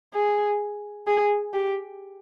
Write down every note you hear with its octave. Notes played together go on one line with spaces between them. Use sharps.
G#4
G#4
G4